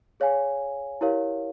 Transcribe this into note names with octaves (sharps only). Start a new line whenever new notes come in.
G#4 C#5 F5 G#5
E4 G4 A#4 C#5 F5